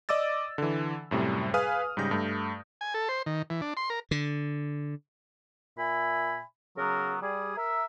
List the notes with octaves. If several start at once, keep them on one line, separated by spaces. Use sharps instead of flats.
D5 D#5 D6 E6 A6
D3 E3
F#2 A2 C3 G3
G#4 B4 F5 G#5 D#6 F6
G#2 C#3 G3 G6 A#6
G2 A3
G#5
A4
C5
D#3
E3
D4
C6
A#4
D3
A#2 E5 G#5 B5
C#3 F#3 B3 A#4
G3 G#4
A#4 E5